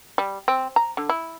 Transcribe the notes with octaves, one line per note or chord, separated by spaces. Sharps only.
G3
C4
A#5
D3
E4